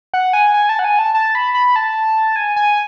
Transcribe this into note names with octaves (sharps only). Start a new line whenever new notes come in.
F#5
G#5
G#5
A5
F#5
G#5
A5
A5
B5
B5
A5
G#5
G#5